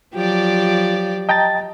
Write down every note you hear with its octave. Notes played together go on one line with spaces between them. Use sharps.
F3 F#3 G4 D5
D#5 G5 A5 A#5 A6